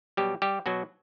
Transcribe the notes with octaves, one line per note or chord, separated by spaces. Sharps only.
B2 F#3 G3 G4
G3 G4
B2 F#3 F#4